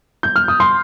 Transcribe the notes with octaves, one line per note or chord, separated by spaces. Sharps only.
G6
F6
D#6
C6